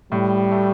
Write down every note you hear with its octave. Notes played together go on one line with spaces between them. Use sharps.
A2 G3
A3